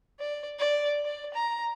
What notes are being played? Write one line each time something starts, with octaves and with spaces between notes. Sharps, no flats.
D5
D5
D5
A#5